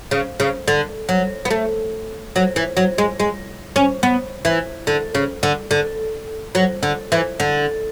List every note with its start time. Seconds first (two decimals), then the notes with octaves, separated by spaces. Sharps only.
0.11 C#3
0.40 C#3
0.68 D3
1.09 F#3
1.45 B3
1.51 A3
2.36 F#3
2.56 E3
2.77 F#3
2.98 G#3
3.20 G#3
3.76 C#4
4.03 B3
4.45 E3
4.87 D3
5.15 C#3
5.43 D3
5.71 D3
6.55 F#3
6.83 D3
7.12 E3
7.40 D3